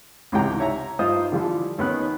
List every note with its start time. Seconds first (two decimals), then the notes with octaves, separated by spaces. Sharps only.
0.32 C#2 G#2 C3 E3 G5 A#5
0.60 C#5 E5 A#5
0.99 G2 D#4 F4 C5 D#6
1.32 D3 E3 F3 G3
1.78 D#2 D#3 B3 C#4 F#6